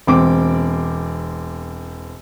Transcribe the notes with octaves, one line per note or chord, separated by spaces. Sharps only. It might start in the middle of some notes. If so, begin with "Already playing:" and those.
E1 C4 D6